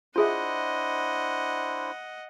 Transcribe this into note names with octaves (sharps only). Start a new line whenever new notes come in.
D4 E4 F4 G#4 C5 D#5 E5 F#5